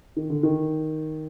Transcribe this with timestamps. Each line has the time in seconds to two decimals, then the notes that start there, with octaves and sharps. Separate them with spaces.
0.16 D#3
0.30 D3
0.43 D#3